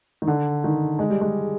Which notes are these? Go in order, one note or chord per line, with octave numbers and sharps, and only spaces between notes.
D#3
D3
D#3
G#3
G3
G#3